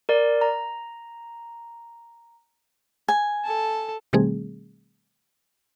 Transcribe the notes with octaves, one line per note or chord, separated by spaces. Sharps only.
A#4 D5
A#5
G#5
A4 A5
B2 D#3 G3 A3 C4 G#4